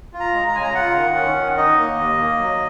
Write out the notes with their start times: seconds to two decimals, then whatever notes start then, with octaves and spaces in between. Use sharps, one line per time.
0.14 F4
0.20 A#5
0.34 G#3
0.48 A#5
0.55 C#3 G#5
0.63 A#5
0.75 F4 F#5
0.96 D#3
1.16 C#4
1.36 D#3
1.57 D#4 D#5
1.77 A#3
1.98 D#2
2.18 A#3
2.39 F#3